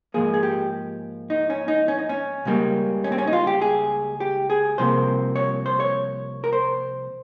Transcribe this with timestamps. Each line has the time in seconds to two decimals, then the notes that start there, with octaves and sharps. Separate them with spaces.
0.14 G#2 F3 A#3 G#4
0.34 G#4
0.43 G4
1.30 D#4
1.50 C#4
1.68 D#4
1.88 C#4
1.99 D#4
2.09 C#4
2.45 C#2 C#3 G3 A#3
3.04 C#4
3.12 C4
3.18 C#4
3.27 D#4
3.33 F4
3.47 G4
3.61 G#4
4.20 G4
4.50 G#4
4.78 C2 C3 F3 A#3 C5
5.35 C#5
5.66 C5
5.80 C#5
6.44 A#4
6.53 C5